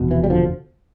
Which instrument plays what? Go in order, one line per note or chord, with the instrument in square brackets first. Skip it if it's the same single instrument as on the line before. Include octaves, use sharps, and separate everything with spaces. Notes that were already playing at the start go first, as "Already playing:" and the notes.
Already playing: [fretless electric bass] F1 E2 B2
E3
G3
D3 F3